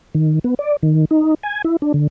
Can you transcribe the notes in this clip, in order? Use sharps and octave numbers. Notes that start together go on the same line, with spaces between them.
D#3
B3
D5
D#3
D#4
G#5
E4
D4
D3